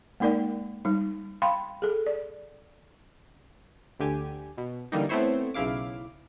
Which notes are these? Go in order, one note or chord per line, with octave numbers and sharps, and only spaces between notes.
G#3 A#3 D#4 A#4 D5 G5
G3 D#4
F5 G5 B5 C6
G#4 A4
D5
D2 D3 G4 G#5
B2
D3 E3 G3 A#3 D#4
A3 B3 C4 E4 C5 C#5
B1 C#3 E4 F5 D6